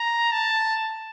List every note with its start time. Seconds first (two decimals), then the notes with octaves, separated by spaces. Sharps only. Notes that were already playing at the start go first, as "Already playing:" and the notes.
Already playing: A#5
0.32 A5